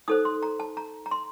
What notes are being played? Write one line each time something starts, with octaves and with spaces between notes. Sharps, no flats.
D#4 A4 C5 D#6
C6
A#5
A5
A#5
A#5
C6